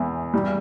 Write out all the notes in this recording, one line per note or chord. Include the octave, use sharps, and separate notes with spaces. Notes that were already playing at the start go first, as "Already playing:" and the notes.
Already playing: E2 G#3
G3